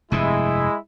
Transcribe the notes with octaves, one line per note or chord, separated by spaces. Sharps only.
F1 G2 C3 G#3 E4